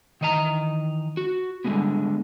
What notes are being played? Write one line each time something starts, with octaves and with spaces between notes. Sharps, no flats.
D#3 E3 D#5 F5 A#5
F#4
D3 G3 G#3 B3